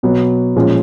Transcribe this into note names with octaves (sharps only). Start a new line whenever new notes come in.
B2 F#3 B3
A#2 F3 G#3 C#4